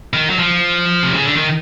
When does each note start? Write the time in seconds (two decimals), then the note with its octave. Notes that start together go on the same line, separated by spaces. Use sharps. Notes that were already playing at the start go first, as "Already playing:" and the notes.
0.14 D#3
0.30 F#3
0.39 F3
1.03 C3
1.14 C#3
1.25 D3
1.36 D#3